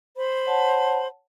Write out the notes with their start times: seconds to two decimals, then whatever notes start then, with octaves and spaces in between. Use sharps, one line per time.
0.17 C5 B5
0.46 C#5 F#5 A5